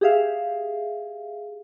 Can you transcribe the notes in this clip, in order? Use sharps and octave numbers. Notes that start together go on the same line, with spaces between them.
G4 G#4 E5 F5